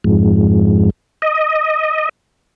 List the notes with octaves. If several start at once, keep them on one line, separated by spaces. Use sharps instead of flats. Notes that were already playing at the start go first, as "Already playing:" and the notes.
F2 G#2
D#5